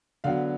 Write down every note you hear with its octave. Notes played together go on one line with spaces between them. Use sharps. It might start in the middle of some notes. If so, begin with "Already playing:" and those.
D3 F#3 B3 F5